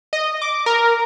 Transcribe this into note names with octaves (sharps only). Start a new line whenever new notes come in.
D#5
D6
A#4